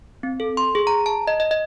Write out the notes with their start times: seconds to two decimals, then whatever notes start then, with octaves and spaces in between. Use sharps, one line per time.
0.23 C4
0.40 A4
0.57 C6
0.75 G#4
0.87 A#5
1.06 A5
1.27 D#5
1.40 D#5
1.51 D#5